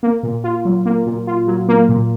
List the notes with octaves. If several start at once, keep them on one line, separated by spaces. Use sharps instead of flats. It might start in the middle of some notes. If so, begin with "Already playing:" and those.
A#3
A#2
F4
F#3
A#3
A#2
F4
F#3
A#3
A#2